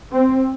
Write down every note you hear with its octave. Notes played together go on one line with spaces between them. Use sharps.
C4